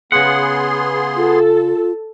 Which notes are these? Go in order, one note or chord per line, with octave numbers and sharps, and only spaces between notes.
C#3 B3 G#4 F#5 C6
F4 A4